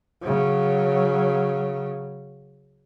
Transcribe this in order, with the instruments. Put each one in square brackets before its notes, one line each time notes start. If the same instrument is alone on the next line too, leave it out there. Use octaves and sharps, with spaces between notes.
[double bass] C#3 F#3